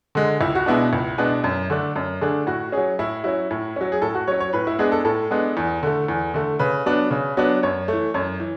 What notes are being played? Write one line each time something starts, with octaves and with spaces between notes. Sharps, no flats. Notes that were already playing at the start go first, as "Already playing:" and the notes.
D3 G#3
C#2 E4
F#4
B2 G#3 B3 D4 E4
C#2
B2 G#3 B3 D4
F#2
D3 A3 D4
F#2
D3 A3 D4 G#4
A2 F#4
F#3 C#4 G#4
A2 E4
F#3 C#4 E4
A2
F#3 C#4
G#4
A2 A4
F#4
F#3 C#4 C#5
C#5
A2 B4
E4
G#3 B3 D4 G#4
A4
A2 A4
G#3 B3 D4
E2
D3 A3
E2
D3 A3
C#3 B4
F#3 B3 D4
C#3
F#3 B3 D4
F#2 C#5
A3
E3
F#2 C#5
E3